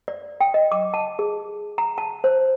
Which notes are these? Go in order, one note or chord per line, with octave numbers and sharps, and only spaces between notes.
D5
G5
D#5
D6
A5
G#4
A#5
A5
C5